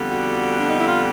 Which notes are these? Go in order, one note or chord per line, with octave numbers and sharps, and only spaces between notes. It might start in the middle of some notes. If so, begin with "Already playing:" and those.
Already playing: F2 D3 G3 B3
F#4
D4
D#4
E4
F4